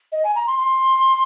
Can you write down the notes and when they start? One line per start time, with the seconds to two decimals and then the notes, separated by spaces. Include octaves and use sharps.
0.12 D#5
0.24 G#5
0.35 A#5
0.47 C6
0.59 C6